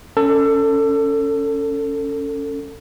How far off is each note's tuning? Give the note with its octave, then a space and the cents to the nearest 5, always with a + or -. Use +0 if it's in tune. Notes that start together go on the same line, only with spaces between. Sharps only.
C#4 +10 A4 +25